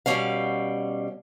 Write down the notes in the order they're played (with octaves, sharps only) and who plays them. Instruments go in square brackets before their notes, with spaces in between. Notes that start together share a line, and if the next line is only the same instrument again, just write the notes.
[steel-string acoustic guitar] B2 G3 C#4 F5